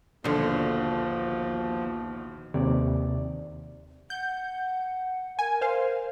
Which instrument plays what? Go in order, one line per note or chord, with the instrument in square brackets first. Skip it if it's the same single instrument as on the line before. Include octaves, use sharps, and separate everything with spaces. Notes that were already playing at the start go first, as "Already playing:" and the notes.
[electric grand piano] A#1 B2 [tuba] D#2 [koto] D3 C5 [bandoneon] F3
[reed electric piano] D#2 C3 D5
[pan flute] F#5 [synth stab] G6
[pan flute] A#4 [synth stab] G#5
[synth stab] C5 F5